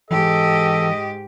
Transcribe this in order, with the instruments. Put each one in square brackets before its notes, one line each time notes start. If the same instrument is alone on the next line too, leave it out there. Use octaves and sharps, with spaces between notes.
[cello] G#2 G4 [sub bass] E3 [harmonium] A4 [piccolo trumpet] D#5